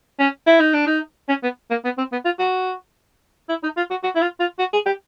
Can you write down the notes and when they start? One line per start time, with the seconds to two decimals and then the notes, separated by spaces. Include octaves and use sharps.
0.19 C#4
0.46 E4
0.60 D#4
0.74 D4
0.86 D#4
1.28 C#4
1.43 B3
1.70 A#3
1.84 B3
1.98 C4
2.12 B3
2.25 F4
2.39 F#4
3.49 E4
3.63 D#4
3.77 F4
3.90 F#4
4.03 F#4
4.16 E4
4.22 F4
4.40 F4
4.59 F#4
4.73 G#4
4.86 G4